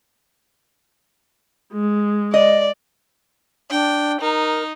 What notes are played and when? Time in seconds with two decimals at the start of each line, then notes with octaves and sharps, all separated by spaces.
1.73 G#3
2.34 D5 D#5
3.71 D4 G5
4.21 D#4 A#4